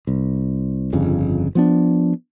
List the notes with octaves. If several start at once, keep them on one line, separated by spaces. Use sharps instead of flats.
C2
G1 F2 C#3
F3 B3 D4